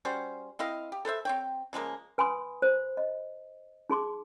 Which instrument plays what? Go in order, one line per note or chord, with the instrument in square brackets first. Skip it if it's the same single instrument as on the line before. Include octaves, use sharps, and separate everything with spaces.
[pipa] G3 C#4 F#4 C5
C4 E4 D#5 F5
G4
A4 B4 C5 E5
C4 C#5 G5
C#3 F3 G#3 A#3
[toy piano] B4 G#5 B5 C6 D#6
C5
D#5
D#4 G#4 C6 D6